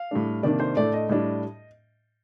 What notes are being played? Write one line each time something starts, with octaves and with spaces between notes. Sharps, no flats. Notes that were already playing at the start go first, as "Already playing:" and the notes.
Already playing: F5
A2 G3 D4
C3 D#3 A#3 D4 D5
C5
A2 A3 D4 D5
D#5
A2 G3 D4